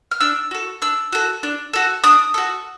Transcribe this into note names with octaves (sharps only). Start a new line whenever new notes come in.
F6
D4 E6
F#4 A4
D4 E6
F#4 A4
D4
F#4 A4
D4 D#6
F#4 A4